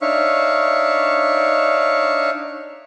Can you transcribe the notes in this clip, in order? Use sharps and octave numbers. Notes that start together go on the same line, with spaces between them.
D4 D#4 C#5 E5 F5 C#6